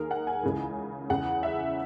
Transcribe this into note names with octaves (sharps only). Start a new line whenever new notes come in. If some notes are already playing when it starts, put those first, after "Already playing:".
Already playing: D#2 D#3 G#4 A#4
F#5
G#5
C#2 C#3 E3
E2 C#3 E3 F#5
E5